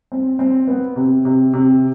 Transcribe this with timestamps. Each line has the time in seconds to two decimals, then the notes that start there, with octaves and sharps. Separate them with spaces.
0.12 C4
0.39 C4
0.68 B3
0.96 C3
1.25 C3
1.53 C3